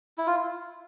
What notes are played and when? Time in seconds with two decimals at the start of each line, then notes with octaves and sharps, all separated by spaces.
0.18 E4
0.27 F4